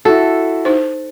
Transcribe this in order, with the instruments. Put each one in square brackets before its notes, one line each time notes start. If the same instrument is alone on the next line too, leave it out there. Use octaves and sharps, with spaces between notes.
[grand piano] E4 F#4 [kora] A4
[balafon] D#4 C5